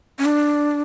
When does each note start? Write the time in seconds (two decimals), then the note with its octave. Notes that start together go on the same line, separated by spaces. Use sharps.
0.19 C#4
0.25 D4